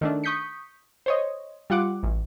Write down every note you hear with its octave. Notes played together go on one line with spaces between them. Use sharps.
D#3 A3 D4
C#6 D#6 G6 B6 C#7
C5 C#5 D#5
G3 F4 F#5 D6
A1